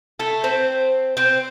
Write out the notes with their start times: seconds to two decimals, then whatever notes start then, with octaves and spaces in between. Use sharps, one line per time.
0.19 A3 A4
0.44 C4 C5
1.17 C4 C5